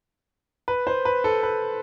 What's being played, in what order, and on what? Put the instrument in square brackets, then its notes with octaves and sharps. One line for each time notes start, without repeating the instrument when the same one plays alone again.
[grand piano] B4
C5
B4
A4
B4